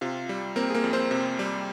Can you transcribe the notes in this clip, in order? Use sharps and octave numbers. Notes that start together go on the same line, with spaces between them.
C3 F4 F5
G3
A#3 C4 A#4
G#4
A#3 A#4
F2
C4 C5
C3
G3